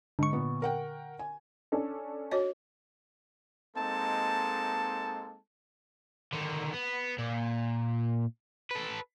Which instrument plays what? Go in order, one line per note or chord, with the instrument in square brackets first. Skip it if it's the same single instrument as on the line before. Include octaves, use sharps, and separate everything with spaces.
[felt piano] G#2 [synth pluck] D3 C#6
[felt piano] A#2 B3
A#4 F#5 G5
G#5
[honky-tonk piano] C#4 D4 A4
[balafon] F#4 C#5 D#5
[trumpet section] G#3 A#3 C4 D#4 A4 A5
[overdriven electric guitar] D3 D#3
B3
A#2
A4 B4